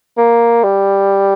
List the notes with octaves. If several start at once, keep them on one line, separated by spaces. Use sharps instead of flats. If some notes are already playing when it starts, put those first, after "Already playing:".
A#3
G3